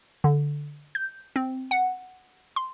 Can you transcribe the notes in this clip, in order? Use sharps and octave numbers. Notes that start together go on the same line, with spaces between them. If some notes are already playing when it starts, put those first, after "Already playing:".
D3
G6
C4
F#5
C6